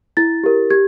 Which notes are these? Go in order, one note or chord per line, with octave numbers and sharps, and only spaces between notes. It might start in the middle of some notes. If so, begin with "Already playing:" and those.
E4 A6
G4 A#4
G4 G#6